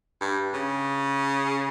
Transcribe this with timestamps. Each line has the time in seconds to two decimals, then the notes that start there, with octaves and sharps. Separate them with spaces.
0.21 G2
0.53 C#3